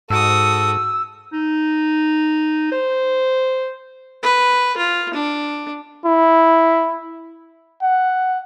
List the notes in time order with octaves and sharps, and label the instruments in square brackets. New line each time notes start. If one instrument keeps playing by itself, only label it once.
[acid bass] G#2 [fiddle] F#4 D#6 [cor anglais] A4 [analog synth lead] E6
[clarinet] D#4
C5
[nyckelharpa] B4
F4
D4
[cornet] E4
F#5